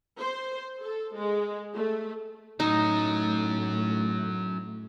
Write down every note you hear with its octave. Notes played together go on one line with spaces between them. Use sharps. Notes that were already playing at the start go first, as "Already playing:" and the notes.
C5
A4
G#3
A3
A2 F#3 C#4 D#4